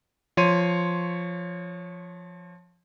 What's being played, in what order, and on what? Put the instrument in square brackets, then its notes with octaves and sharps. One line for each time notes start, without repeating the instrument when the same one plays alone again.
[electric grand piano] F3 C#5 C6 D#7